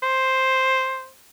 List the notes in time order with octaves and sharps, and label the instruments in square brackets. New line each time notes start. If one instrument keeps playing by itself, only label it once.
[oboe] C5